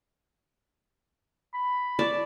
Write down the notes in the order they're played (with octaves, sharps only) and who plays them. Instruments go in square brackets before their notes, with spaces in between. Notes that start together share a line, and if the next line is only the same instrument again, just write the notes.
[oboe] B5
[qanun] D5 A5 C#6